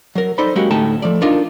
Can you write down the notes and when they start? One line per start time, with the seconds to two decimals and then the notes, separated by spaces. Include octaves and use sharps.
0.15 F#3 A#4
0.38 D#4 A4 C5 D5 B5
0.56 F#3 G#3 A#3 C#4 F#4 G4
0.71 D2 A2 A3 D#4 G5 A5
1.02 F3 A3 D5
1.22 D4 D#4 F4 A#4